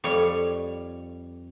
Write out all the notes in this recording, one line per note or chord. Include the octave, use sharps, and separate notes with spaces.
F2 G3 C#5